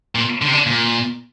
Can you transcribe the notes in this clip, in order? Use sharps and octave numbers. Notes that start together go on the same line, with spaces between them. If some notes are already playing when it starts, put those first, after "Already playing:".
A#2
D3
C3
D3
A#2